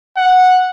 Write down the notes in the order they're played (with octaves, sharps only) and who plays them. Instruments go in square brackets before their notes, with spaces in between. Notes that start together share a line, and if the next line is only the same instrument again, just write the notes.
[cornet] F#5